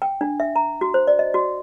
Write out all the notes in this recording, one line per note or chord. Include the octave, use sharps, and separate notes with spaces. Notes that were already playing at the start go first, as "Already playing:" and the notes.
G5
D4
E5
A#5
F#4
C5
D5
D#5
F#4